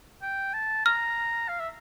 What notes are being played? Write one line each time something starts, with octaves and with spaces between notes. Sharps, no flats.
G5
A5
A#5 F6
F5
E5